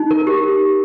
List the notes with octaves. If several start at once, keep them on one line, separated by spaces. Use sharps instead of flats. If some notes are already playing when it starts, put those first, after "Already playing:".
Already playing: D#4
A#4
G4